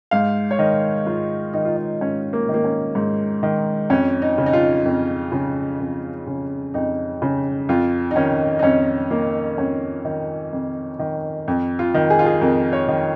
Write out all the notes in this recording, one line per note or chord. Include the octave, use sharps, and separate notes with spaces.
G#2 F5
C#5
D#3 D#5
G#2 F4
D#3 D#4
F4
D#4
G#2 C#4
A#3
D#3
A#3
C#4
G#2
D#3
F2 C#4
D#4
C#3
D#4
F4
F2
C#3
F2
C#3
F2 D#4
C#3
F2 F4
D#4
D#3 C#4
D#4
F2 C#4
D#3 A#3
F2 C#4
D#3
F2
D#3
F2
F4
D#3
G#4
F4
G#4
F2 A#4
C#5
D#3